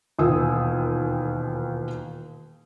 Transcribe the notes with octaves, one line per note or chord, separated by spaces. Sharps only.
E1 D#2 A#2 G#5 D#6 E6